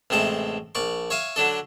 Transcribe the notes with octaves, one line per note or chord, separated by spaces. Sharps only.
A1 C3 G#3 A4 E5
A#1 D5 C#6
C#5 E5 F5 G#5
D3 F#3 D4 A4